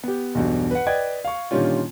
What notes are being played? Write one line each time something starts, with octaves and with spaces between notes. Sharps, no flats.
B3 G4
B1 E2 G2 B2
B4 F#5
B4 D5 D#5 G5 G#6
F5 C#6
A#2 D3 D#3 G3 C#4 F4